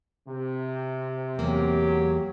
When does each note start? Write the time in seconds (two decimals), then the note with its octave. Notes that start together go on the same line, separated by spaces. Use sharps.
0.27 C3
1.39 E2 F#3 A#3 G4